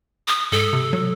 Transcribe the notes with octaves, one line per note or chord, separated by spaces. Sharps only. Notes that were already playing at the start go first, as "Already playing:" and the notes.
D#6
G#2 A4
C3
F#3